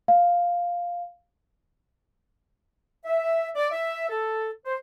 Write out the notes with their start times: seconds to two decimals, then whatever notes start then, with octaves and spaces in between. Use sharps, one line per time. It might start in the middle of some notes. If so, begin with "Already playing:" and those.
0.08 F5
3.05 E5
3.55 D5
3.72 E5
4.09 A4
4.65 C5